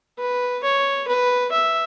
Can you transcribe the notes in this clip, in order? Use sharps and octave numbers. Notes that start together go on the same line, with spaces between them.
B4
C#5
B4
E5